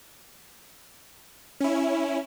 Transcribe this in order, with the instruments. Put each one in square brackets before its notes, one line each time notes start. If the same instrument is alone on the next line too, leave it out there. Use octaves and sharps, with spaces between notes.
[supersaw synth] C#4 E4